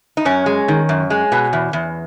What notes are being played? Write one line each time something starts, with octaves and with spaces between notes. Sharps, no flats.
D#4
F#2 C#4
G#3
D#3
F#2
G#3
B2
E2
E2